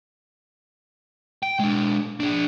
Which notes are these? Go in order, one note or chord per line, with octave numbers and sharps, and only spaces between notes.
G5
G#3 D4
D4 G#4